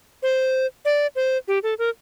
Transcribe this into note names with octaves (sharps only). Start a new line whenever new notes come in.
C5
D5
C5
G4
A4
A#4